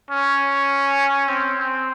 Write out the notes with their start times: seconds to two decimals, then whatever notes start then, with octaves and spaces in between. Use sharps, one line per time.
0.11 C#4
1.28 C4
1.58 C4